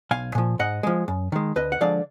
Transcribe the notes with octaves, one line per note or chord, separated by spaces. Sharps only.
B1 F5 G#5
A#2 F3
G#2 D#5 F#5
F3 G#3
F#2
D#3 G#3
D2 B4 D#5
F#5
D3 F3 G#3 D5 F5